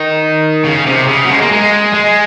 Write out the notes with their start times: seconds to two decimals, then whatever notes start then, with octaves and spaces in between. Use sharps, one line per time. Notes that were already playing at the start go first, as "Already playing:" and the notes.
Already playing: D#3
0.65 C#3
0.86 C3
1.08 C#3
1.25 F#3
1.29 G#3
1.41 A#3
1.51 G#3
1.94 G#3